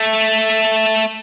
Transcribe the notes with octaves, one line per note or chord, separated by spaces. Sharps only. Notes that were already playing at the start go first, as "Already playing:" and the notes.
Already playing: A3